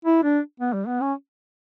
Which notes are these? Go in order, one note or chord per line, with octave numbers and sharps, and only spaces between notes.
E4
D4
B3
G3
B3
C#4